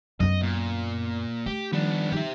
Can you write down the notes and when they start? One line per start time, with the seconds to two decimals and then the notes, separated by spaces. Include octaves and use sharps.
0.20 F#2 B3 D#5
0.42 A#2
1.46 A3 G4
1.73 D#3 F3 G3 B3 D4
2.12 D#4 G4 E5